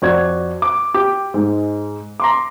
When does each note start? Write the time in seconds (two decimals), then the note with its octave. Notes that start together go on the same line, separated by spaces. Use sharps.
0.02 F2 F#4 D5 G#6
0.62 D6
0.94 G4 D6
1.34 G#2 G#3
2.20 A#5 C6 D6